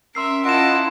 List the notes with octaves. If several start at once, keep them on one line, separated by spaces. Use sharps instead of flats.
C#4 A#4 E5 C6 E6 C7
E4 F4 D#5 F#5 A5 D7 E7